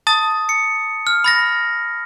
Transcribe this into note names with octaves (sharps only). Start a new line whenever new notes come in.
A5 D#6 A6
C#7
F6
B5 A6 A#6